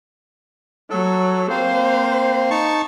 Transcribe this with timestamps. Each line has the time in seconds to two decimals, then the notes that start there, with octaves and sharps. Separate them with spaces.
0.90 F#3 A4
1.50 A#3 C4 C5 F5
2.51 D#4 A5 C#6